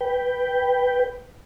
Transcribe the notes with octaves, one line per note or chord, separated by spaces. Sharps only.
B4 G5